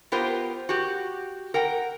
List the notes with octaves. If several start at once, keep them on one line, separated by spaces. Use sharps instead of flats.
B3 F4 G4 A#4 C5
F#4 G4
A#4 F#5 G5